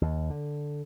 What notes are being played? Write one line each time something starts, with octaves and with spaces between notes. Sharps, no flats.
D#2
D3